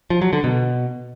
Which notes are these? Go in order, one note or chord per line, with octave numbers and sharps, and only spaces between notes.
F3
F#3
D3
B2